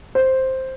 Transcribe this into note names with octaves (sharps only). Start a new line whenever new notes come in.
C5